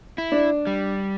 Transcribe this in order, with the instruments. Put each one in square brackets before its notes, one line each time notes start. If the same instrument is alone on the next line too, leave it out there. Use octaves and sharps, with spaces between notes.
[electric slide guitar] E4
[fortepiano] D4
[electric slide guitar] G3